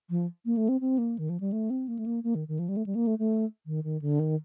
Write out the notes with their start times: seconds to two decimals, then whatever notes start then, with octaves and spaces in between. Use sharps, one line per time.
0.10 F3
0.46 A#3
0.57 A3
0.69 C4
0.81 C4
0.98 A#3
1.18 D#3
1.29 F3
1.40 G3
1.52 A3
1.70 C4
1.88 A#3
1.99 A3
2.06 A#3
2.24 A#3
2.35 D#3
2.48 D#3
2.59 F3
2.69 G3
2.77 A3
2.86 G3
2.95 A#3
3.07 A3
3.19 A3
3.66 D#3
3.84 D#3
4.02 D3
4.19 D#3